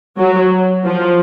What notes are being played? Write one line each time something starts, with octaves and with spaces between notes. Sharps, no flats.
F#3
F3